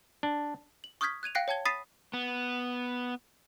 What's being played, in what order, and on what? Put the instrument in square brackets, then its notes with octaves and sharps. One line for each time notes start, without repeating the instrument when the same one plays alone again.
[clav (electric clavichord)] D4
[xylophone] F#7
C#6 D#6 F6 G6 G#6 B6
F#6 G#6 D#7 F7
F5 G5 F#6 A#6 C7 D7
C#5 G5 A5 G#6 G7
B5 D#6 A6 B6 C7 D#7
[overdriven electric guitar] B3